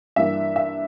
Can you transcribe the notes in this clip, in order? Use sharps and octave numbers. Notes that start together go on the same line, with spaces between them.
G2 E3 A#3 E5
E5